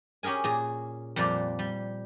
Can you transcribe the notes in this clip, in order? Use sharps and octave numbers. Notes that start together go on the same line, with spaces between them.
C#4 G4 G#4 A#4 G#5
A#2 G#4 A#5
F2 A#2 G3 C5 D5 F5
G3